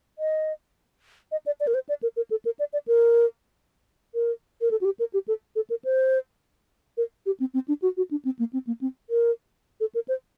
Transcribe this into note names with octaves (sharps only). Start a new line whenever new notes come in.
D#5
D#5
D5
D5
A#4
C5
D5
A#4
A#4
A4
A#4
D5
D5
A#4
A#4
A#4
A4
F#4
G4
A#4
G4
A4
A4
A#4
C5
A#4
G4
C4
C4
D4
F#4
F#4
D4
C4
A#3
C4
A#3
C4
A#4
A4
A#4
C5